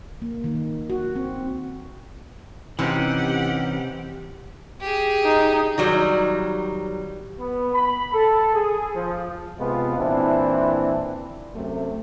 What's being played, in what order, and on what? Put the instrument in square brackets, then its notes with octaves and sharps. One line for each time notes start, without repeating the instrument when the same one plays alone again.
[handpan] A#3
D#3
F#4
C4
[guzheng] C3 [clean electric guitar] E3 C#4 D#4 [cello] G4 F#5
[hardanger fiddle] G4 G#4
[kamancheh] D#4
[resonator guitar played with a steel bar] D#3 F#3 G3
[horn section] B3
B5
A4
G#4
F3
[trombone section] C3 G#3 B3 F4
A#2 E3 C4 D4 E4
F#2 C3 A3